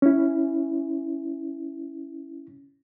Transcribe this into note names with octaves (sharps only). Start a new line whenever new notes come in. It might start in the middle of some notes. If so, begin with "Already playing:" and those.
C#4 E4